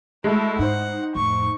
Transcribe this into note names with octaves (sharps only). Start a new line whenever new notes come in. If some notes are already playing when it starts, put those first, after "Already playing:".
G#3 A3 E4 F#4
G#2 D#4 C5 F#5
F2 A2 C#6